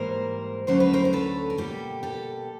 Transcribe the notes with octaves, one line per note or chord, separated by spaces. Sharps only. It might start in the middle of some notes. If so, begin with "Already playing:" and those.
Already playing: G#2 E3 G3 A#3 A#4 C5
D2 D3 F#3 A3 C#4 C5
B4
A#4 C5
C5
A4 B4
A#4
B2 G3 A#3 G4 A4
G4 A4